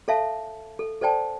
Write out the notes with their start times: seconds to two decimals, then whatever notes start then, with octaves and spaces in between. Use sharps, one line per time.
0.08 A4 C#5 E5 F5 A5
0.79 A4
1.01 A4 C5 D5 G5 A5